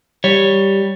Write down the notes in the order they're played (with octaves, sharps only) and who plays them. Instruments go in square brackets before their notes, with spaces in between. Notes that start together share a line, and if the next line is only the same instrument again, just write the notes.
[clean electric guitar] G3 C#5